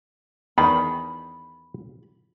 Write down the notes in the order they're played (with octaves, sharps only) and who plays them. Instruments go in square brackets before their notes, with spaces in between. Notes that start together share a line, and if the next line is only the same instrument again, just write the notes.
[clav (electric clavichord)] E2 D#3 [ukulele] B5